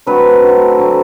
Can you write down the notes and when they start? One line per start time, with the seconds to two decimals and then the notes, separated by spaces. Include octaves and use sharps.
0.06 D3 F#3 A3 C4 B4
0.43 D3 F#3 A3 C4
0.79 D3 F#3 A3 C4